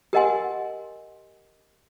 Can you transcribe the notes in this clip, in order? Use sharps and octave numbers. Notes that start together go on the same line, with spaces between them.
G4 A#4 D#5 F#5 G#5 C6